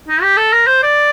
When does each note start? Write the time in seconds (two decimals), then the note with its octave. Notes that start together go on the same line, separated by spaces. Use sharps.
0.08 D#4
0.22 G4
0.37 A4
0.53 A#4
0.67 C5
0.83 D5